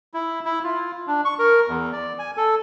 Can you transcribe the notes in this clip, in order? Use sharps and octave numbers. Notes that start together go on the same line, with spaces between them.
E4
E4
F4
D4
C#6
A#4
E2
D5
G#5
A4